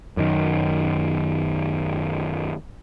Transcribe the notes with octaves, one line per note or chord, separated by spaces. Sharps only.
F#2 D#3